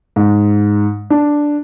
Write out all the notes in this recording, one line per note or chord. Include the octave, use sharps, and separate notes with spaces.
G#2
D4